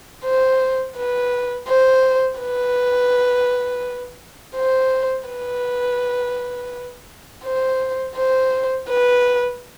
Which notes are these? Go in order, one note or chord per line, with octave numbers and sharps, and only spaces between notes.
C5
B4
C5
B4
C5
B4
C5
C5
B4